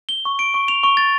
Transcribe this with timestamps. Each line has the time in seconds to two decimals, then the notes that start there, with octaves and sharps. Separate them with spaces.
0.09 G7
0.25 C#6
0.39 D7
0.54 C#6
0.68 F7
0.83 C#6
0.97 A6